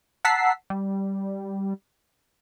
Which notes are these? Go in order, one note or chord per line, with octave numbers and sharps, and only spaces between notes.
F#5 A5 A#5 E6 B6 C7
G3